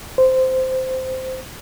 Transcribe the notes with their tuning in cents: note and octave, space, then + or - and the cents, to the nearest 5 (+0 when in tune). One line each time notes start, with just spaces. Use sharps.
C5 -10